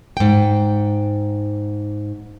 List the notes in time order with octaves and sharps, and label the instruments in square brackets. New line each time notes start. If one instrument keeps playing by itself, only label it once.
[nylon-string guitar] G#2 G5